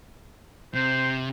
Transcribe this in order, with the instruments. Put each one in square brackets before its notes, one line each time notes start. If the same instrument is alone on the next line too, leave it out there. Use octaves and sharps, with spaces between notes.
[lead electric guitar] C3 [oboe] C5